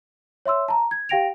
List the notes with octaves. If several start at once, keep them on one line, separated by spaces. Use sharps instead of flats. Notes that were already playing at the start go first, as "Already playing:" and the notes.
C#5 E5 C6 E6
A5 A#5
G#6
G4 F5 G5 A#6 D7 F7